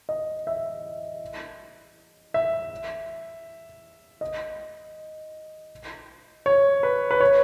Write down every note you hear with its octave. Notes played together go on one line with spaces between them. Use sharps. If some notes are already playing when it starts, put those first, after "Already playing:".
D#5
E5
E5
D#5
C#5
B4
B4
C#5